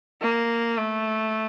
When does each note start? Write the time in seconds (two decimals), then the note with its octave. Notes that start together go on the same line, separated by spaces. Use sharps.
0.21 A#3
0.78 A3